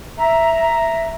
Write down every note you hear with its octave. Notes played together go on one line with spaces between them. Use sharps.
E5 A#5